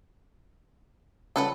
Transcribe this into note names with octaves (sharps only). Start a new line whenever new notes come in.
C#3 F3 G3 A4 B4 F#5